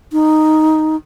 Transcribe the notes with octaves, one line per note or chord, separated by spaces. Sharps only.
D#4